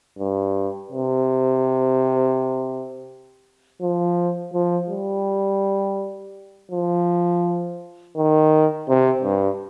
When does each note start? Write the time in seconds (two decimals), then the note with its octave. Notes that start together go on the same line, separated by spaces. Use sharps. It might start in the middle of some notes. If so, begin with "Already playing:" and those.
0.19 G2
0.92 C3
3.82 F3
4.54 F3
4.90 G3
6.71 F3
8.16 D#3
8.89 C3
9.24 G2